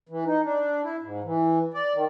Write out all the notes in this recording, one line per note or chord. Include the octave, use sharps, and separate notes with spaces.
E3
D#4
D4
E4
G#2
E3
D5
D#3